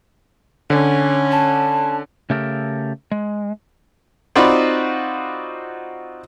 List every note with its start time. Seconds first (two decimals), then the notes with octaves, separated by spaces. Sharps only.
0.70 D3 C#4
1.31 A5
2.30 C#3 A3 G4 A4 A#4
3.12 G#3
4.36 C4 D#4 F4 F#4 D5 B5